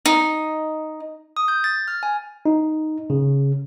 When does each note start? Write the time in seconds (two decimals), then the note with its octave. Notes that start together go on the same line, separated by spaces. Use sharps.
0.06 D#4
1.37 D#6
1.48 G6
1.64 A6
1.88 F6
2.03 G#5
2.46 D#4
3.10 C#3